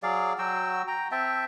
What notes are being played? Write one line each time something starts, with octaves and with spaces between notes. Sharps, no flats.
F#3 G#4 D5 F5
F#3 F#4 G5 E6
G5 A#5
C4 E5 G5 A5